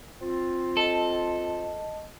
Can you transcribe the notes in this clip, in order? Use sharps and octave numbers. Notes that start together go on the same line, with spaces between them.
C4 F4
A4 D#5 A5